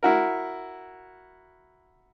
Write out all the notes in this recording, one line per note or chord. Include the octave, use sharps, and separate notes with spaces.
E4 F#4 A#4